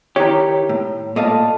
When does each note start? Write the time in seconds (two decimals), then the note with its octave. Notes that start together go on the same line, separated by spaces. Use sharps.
0.16 D#3 E4 G4 C#5 A#5
0.69 A2
1.16 A#2 A3 A4 D#5 F5 A5